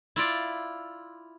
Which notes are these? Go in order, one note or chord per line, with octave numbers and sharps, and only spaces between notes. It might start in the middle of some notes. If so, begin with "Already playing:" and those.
E4 F4 D5